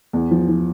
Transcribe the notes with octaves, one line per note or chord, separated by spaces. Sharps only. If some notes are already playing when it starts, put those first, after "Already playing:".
E2
F3
F3